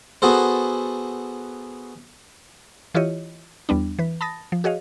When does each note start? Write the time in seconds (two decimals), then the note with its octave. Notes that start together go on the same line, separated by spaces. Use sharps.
0.22 B3 F#4 G#4 A4 C5
2.94 E3 E4 F4 G4 C#5 D#5
3.69 E2 G3 B3 D4
3.99 E3 B4
4.21 A5 B5 D#6 A6 A#6
4.52 F3
4.64 F#4 G#4 C#5 D#5 F5